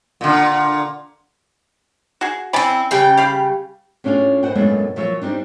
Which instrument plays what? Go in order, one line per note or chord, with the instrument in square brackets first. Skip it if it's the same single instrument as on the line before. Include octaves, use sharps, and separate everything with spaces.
[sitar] A#2 D3
[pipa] F#4 G#4
[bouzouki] C4 E4 [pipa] D5 G#5 B5
[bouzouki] C#3 G3 G5
[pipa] G4 F5 B5
[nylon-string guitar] A2 C#4 D4 F4 G#4 F5
B4 C5 D#5 F#5 G5
F#2 A#2 G#3 A3 B3 D4
A#2 F3 F#3 F4 C#5 E5
G3 C4 D4 D#4